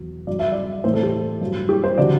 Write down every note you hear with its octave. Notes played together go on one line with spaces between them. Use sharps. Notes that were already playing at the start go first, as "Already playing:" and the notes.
Already playing: E2 B2 F#3
G2 F#3 D5
E5
D5
A2 E3 C5
A4
G4
G2 F#3
G4
C5
D3 F#3 D5